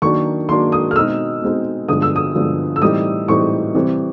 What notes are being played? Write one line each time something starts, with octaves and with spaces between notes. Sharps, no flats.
D#3 F#3 A#3 D4 C#6
D#3 F#3 A#3 D4 C6
D#6
F6
B2 G#3 C4 D#4 E6
B2 G#3 C4 D#4
G2 D3 F3 G#3 B3 D#6
E6
D#6
G2 D3 F3 G#3 B3
E6
A2 E3 G3 C4 D#4 D#6
A2 E3 G3 C4 D#4 C#6
C3 E3 G3 C4